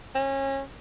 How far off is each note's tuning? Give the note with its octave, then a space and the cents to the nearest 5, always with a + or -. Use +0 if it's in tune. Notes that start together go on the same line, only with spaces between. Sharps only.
C#4 -30